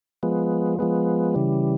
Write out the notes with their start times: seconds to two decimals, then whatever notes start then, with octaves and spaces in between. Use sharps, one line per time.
0.23 F3 G#3 B3
0.79 F3 G#3 B3
1.35 C#3 E3 G3